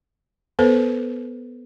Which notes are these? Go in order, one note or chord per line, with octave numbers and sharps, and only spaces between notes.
B3 A4 B4 C5